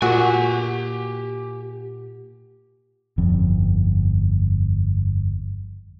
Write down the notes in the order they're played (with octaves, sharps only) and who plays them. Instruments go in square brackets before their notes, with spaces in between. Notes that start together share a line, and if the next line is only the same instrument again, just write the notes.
[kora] A#2 [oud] F#4 [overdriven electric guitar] G4 G#5
[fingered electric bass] G1 F2